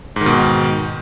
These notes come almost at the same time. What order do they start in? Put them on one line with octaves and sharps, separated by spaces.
G#2 D#3 B2